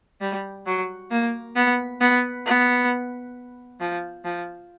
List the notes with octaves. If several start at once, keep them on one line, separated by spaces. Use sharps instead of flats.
G3
F#3
A#3
B3
B3
B3
F3
F3